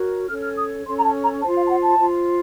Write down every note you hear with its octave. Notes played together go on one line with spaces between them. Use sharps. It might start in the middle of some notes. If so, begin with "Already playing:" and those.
Already playing: F#4 A#4 C#5
C#4 A4 C#5 F6
F6
D#6
C#4 A4 C#5 C6
A#5
A5
A#5
F4 C5 A5
F5
A5
F#5
A5
F4 C5